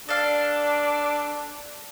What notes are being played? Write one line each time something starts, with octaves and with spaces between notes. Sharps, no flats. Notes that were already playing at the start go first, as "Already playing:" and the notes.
D4 A4 F5